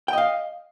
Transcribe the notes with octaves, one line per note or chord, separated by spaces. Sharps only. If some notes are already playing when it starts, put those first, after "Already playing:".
D#5 F5 G5